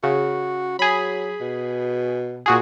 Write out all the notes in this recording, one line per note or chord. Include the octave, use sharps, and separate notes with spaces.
C#3 F#4
F#3 G#4 B5
B2
A#2 F#4 G#4